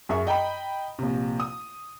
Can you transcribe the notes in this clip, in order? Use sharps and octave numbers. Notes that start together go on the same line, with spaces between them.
F#2 G#4 E5 C#6
D#5 G5 A#5 B5
A#1 C3
D#6